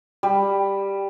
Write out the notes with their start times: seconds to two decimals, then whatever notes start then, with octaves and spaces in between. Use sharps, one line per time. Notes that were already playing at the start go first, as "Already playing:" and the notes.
0.23 G3